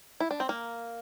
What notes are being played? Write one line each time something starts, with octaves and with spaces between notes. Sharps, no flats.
E4
D4
C4
A#3